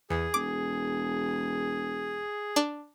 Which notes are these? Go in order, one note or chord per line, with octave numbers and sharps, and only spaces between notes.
E2 G#4
E1 D6
D4